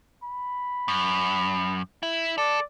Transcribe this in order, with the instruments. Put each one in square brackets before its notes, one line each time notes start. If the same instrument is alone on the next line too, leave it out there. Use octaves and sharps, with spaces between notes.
[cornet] B5
[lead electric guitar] F#2
E4
[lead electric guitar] A4 [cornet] D5